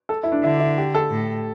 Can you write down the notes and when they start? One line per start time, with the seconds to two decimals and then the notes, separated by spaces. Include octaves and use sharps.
0.09 A4
0.23 E4
0.32 D4
0.43 D3 E4
0.60 E4
0.78 G4
0.95 A4
1.11 A2